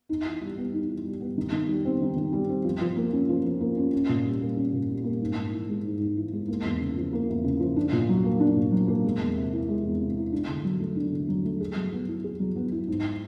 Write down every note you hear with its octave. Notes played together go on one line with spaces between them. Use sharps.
D#4
E3
G3
B3
D#4
E3
G3
B3
D#3
D#3
G3
C4
D#3
D#3
G3
C4
F3
F3
A#3
C#4
F3
F3
A#3
C#4
C#4
A#2
G3
A#3
C#4
A#2
G3
A#3
G#2
G#2
E3
G#3
G#2
G#2
E3
G#3
A#3
E2
C#3
F3
A#3
E2
C#3
F3
D4
A#2
F#3
A#3
D4
A#2
F#3
A#3
G#3
E2
C3
E3
G#3
E2
C3
E3
D4
D3
F#3
A3
D4
D3
F#3
A3
G#4
F#3
B3
E4
G#4
F#3
B3
E4
G#2